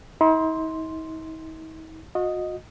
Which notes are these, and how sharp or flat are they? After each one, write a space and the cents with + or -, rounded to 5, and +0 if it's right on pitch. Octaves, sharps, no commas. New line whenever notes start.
D#4 +45 C6 +0
F#4 -40 D#5 +0